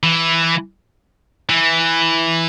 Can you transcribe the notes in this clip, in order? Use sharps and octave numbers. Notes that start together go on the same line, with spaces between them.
E3
E3